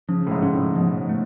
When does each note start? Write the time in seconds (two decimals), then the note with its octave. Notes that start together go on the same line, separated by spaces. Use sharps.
0.09 C#3 F3
0.27 A2
0.31 G#2
0.43 C#4
0.54 A2
0.75 B2 F3
1.09 A3